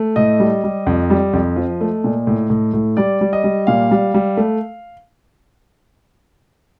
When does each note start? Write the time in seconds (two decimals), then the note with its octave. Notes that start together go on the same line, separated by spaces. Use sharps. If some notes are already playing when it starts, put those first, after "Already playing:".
Already playing: A3
0.16 A2 D#5
0.40 G3
0.64 G3
0.87 F2
1.10 G3
1.33 F2
1.56 F3
1.81 A3
2.04 A#2
2.27 A2
2.50 A2
2.73 A2
2.97 G3 D5
3.21 G3
3.33 D#5
3.44 G3
3.67 A#2 F5
3.91 G3
4.14 G3
4.37 A3